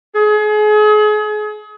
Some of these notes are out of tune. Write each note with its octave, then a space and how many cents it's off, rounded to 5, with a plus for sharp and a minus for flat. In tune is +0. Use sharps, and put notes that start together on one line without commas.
G#4 +35